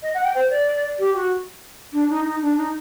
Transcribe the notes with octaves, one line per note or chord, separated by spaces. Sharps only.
D#5
F#5
G5
C5
D5
G4
F#4
D4
D#4
D#4
D4
D#4